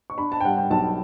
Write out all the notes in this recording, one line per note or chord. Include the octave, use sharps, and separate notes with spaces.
C#6
D4 B5
A5
G5
G3 F#5
G5
B1 A5